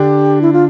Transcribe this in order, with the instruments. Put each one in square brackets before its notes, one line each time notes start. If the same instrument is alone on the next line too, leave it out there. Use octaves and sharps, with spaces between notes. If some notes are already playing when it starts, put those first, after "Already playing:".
Already playing: [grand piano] D3 D4 [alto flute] G4
[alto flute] E4
F4